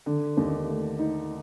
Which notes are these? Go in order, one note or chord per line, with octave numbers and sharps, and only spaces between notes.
D3
D#2
A3
D#4